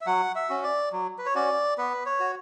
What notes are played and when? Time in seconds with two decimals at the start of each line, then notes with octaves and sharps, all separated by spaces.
0.01 E5
0.06 F#3 F#5
0.35 E5
0.49 C#4 F#4
0.63 D5
0.92 F#3
1.18 B4
1.26 C#5
1.35 C#4 F#4 D5
1.78 B3 B4
2.06 C#5
2.20 F#4